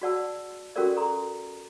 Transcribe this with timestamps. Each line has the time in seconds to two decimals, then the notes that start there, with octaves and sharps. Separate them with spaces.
0.02 F#4 G#4 D5 F#5 A5 E6
0.76 C#4 F#4 G4 A4 A#4 D5
0.96 G#4 A4 A#5 C6